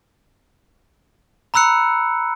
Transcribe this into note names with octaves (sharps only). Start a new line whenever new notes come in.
A#5 B5 E6 F#6 C#7